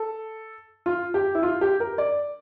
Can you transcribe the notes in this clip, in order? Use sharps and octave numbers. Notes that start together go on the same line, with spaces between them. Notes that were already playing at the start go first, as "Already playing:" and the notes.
Already playing: A4
F4
G4
E4
F4
G4
A#4
D5